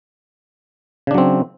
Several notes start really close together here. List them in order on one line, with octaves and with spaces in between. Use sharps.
C#3 D4 F#3 C4